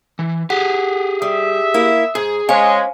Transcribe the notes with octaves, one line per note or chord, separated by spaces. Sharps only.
E3
G4 G#4 F#5
G3 E5 D#6
A#3 E4
G#2 G#4
G#3 C#4 C5 C#5 F5 G#5